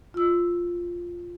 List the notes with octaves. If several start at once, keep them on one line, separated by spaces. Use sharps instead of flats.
F4 E6